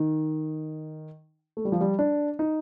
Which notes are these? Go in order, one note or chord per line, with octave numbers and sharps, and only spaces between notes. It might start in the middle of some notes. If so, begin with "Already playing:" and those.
Already playing: D#3
A3
G3
F3
G3
D4
D#4